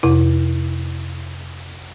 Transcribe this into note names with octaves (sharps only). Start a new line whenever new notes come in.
F2 C3 E4